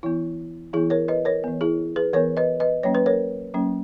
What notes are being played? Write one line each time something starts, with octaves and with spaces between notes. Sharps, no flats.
E3 B3 E4
E3 B3 E4 G#4
A#4 C#5
B4 D#5
A#4 C#5
E3 B3
E4 G#4
G#4 B4
E3 B3 A#4 C#5
B4 D#5
B4 D#5
F#3 A#3 C#4 C#5
B4
A#4 C#5
F#3 A#3 C#4